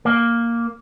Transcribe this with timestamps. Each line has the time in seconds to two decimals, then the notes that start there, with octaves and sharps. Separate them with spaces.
0.05 A#3